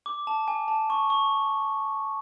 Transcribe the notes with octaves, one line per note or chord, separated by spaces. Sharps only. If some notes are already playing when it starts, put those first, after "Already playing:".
D6
A5
G#5
A5
C#6
C#6